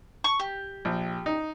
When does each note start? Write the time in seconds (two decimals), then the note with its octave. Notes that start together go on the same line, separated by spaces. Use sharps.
0.24 C#6
0.40 G4
0.85 A#1
1.26 D#4